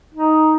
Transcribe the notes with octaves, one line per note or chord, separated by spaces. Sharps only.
D#4